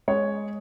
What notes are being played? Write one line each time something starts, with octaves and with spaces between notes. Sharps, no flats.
G#3 C#5